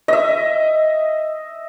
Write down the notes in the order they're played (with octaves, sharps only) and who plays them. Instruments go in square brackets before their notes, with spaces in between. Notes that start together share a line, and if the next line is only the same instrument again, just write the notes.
[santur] D#5 E5